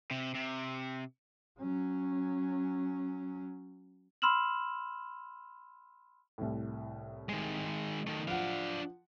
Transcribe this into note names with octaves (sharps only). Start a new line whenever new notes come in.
C3
C3
F#3 C#4
B5 C6 E6 F6 E7 F#7
C2 A2
D#3 G#3
D#3 A3
F3 D4 F5 F#5